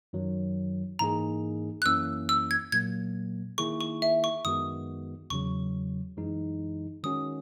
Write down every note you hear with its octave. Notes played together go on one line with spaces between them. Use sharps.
F#2 D#3 F#3
G#2 E3 A#3 D#4 G#4 A#5
F#6
F#2 E3 A#3 C#4 E4 E6
E6
G#6
A#2 F#3 A#3 G#6
D#3 A#3 E4 G#4 C#6
C#6
E5
C#6
F#2 D#3 G#3 B3 F#4 D#6
E2 C#3 F#3 C#6
F#2 E3 G#3 D#4
D#3 G#3 C#4 F#4 D#6